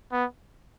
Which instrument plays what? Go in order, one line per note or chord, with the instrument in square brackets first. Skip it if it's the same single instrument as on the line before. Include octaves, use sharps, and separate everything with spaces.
[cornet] B3